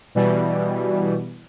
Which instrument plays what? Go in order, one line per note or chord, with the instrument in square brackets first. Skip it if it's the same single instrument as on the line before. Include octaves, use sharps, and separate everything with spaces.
[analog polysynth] B2 E3 G3